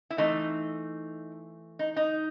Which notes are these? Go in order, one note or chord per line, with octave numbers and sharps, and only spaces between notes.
E4
E3 A3 C4 D#4
D#4
D#4